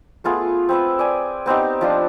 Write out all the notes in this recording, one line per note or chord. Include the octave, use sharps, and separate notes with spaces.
A3 B3 F4 G#4
C4 B4 E5
D5 G#5
B3 C4 D#4 G4
F3 D4 F4